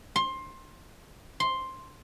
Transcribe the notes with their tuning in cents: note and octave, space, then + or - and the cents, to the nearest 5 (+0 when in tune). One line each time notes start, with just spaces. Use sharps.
C6 +20
C6 +5